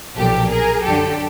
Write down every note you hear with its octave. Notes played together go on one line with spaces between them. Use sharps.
B1 A#2 F3 G4 A4
G#4 A#4
F#2 D3 F#3 G4 A4